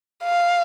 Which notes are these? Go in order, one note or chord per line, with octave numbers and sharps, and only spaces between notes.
F5